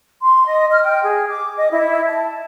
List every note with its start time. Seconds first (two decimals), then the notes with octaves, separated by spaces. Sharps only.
0.22 C6
0.46 D#5
0.71 F6
0.84 G5
1.04 G#4
1.30 D6
1.57 D#5
1.72 E4
2.07 A5